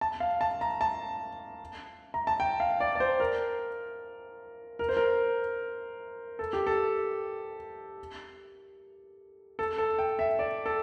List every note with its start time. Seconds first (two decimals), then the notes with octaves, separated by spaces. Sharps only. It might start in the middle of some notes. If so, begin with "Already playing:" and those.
0.01 A5
0.20 F5
0.41 A5
0.61 A#5
0.81 A5
2.14 A#5
2.27 A5
2.40 G5
2.60 F5
2.80 D5
2.95 D5
3.00 C5
3.20 A#4
4.79 A#4
4.89 C5
4.97 A#4
6.39 A4
6.53 G4
6.67 A4
9.59 A4
9.78 A4
9.99 G5
10.19 E5
10.39 D5
10.66 A4